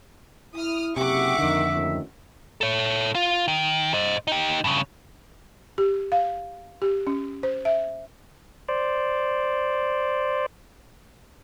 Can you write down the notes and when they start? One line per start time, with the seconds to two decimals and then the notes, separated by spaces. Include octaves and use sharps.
0.54 E4 D#6 F6
0.96 F#1 C3 G4 E5 F#5 C#6 D6
1.39 F2 D3 D#3
1.74 F#2 A2 D#3
2.61 A4 C#5
3.15 F4
3.48 D#3
3.94 C5 D#5
4.27 D#4 G4
4.64 G2 C#3
5.78 G4
6.12 F5
6.82 G4
7.07 C#4
7.43 C5
7.65 E5
8.69 C5 D5